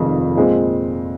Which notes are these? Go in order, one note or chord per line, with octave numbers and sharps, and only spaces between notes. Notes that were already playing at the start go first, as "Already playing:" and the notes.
Already playing: F1 F2 D#3 G#3
A#2 G#3 C4